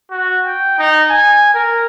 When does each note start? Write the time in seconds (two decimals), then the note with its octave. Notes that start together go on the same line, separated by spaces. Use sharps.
0.11 F#4
0.46 G5
0.78 D#4
1.10 G#5
1.54 A#4